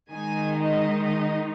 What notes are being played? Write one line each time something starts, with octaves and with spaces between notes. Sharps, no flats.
D#3 G#3 D#4 G#5
D#5
D#5